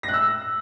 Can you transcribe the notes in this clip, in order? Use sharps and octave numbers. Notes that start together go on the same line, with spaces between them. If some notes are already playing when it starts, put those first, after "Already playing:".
A#6
F#6
E6